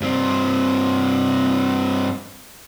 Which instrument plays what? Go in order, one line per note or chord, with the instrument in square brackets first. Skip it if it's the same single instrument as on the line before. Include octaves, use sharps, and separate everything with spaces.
[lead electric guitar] G2 C4